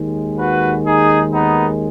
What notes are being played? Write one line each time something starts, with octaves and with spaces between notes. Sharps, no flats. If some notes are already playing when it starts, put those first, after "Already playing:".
Already playing: D#2 D#3 G#3
F#4 B4
D#4 G#4
B3 D#4